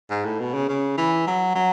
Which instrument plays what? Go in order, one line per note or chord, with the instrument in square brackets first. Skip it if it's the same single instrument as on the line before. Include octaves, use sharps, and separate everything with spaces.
[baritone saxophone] G#2
A2
B2
C#3
C#3
E3
F#3
F#3